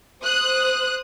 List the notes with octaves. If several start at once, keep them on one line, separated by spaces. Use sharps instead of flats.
C5 D#6 F#6